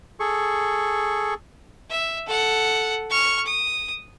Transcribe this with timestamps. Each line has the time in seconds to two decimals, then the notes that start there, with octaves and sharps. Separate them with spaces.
0.20 G#4 A4 C#6
1.90 E5
2.27 A4 F#5
3.11 C#6 F6
3.46 D#6